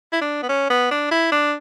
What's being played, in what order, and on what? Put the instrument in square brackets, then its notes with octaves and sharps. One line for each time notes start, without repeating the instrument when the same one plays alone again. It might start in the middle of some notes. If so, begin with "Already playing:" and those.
[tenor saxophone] E4
D4
B3
C#4
B3
D4
E4
D4